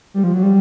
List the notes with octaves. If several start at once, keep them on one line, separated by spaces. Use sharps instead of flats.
G3
F3
F#3
G3